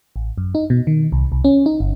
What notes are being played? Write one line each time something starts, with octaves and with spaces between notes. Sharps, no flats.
A1
F#2
D#4
B2
D#3
C2
C2
C#4
D#4
G1